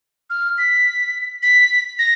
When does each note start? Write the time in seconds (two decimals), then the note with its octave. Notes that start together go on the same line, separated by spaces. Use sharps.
0.30 F6
0.58 B6
1.43 B6
1.99 A#6